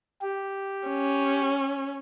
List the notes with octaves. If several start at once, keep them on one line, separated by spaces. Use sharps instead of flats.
G4
C#4